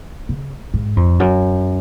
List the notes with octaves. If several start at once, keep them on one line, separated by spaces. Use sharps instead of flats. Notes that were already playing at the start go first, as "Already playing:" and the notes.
C#3
G#2
F2
F#2